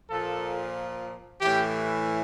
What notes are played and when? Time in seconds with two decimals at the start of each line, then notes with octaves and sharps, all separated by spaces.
0.10 A#2 F3 A4
1.41 A2 E3 G4